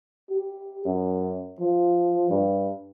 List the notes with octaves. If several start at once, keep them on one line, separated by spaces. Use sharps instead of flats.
G4
F#2
F3
G2